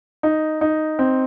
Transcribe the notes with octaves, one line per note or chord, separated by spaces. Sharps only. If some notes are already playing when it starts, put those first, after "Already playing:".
D#4
D#4
C4